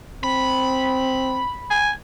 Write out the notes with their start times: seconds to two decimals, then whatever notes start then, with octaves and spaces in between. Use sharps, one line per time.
0.24 C4 B5
1.71 G#5